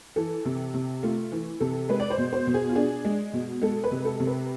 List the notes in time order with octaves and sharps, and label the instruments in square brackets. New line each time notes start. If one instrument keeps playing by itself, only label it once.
[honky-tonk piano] E3 A4
C3
C3
A3 F4
E3
C3 A4
G#3 B4
D5
C5
B2
C5
B2
G#4
F4
D4 G#4
G#3
B2
G#3 A4
B4
C3
A4
C3
B4